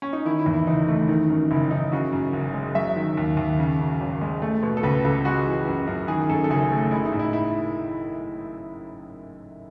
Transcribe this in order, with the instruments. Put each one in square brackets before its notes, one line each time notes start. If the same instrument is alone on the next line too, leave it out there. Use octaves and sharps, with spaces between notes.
[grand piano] C#4
D#4
D#3 E4
E4
E2
E4
F#1 D#4
A3
D#3
F#2
F#1 E4
F#1 D#4
C#3 F#4
F#2
F#1
G#3
F#3 E5
D#3
D#2
D#2
C#3
F#2
G#1
G#3
A3
B2
A4
C#2 B4
C#2 A4
G#3 F#4
E3
F#2
F#2
D#3 G#4
F#2 A4
A4
F#1 G#4
A3
G#3 E4
D#4
A2
E4
E4